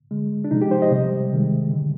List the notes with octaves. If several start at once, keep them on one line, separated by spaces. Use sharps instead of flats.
D3 G#3
D4
C3 F3 G#3 D#4
G4
C5
D#5
C3 G3
C3 D#3 G#3
D3 G3